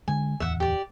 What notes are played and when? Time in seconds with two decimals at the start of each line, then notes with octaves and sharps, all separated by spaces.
0.08 D3 G#3 G#5
0.40 D1 E2 E5 F#5
0.60 G4 D5